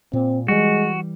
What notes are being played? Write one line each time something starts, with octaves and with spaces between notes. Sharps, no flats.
A#2 C4
E3 G3 G#3 F#4